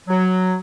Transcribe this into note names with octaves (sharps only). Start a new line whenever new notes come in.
F#3